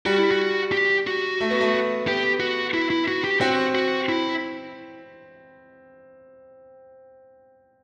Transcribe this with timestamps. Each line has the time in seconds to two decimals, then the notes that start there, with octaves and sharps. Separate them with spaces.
0.06 G3 F#4
0.18 E4
0.31 F#4
0.72 G4
1.07 F#4
1.40 A3
1.51 B3
1.61 A3
2.07 B3 G4
2.40 F#4
2.74 E4
2.90 E4
3.08 F#4
3.24 G4
3.41 C4 F#4
3.75 F#4
4.09 E4